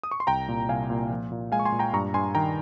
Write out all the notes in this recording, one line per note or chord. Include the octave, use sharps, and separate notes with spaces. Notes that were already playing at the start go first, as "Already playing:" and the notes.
D#6
C#6
C6
C2 G5 A#5
A#2
C2 F5 G#5
A#2
F3
A#2
G#3 F5 G#5
C#6
G#5 C6
A#2
G5 A#5
G2 A#5 C#6
G2 G#5 C6
D#3 G5 A#5